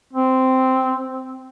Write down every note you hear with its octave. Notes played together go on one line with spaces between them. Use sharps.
C4